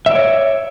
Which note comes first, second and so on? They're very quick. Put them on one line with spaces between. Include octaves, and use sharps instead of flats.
E5 D5 C#5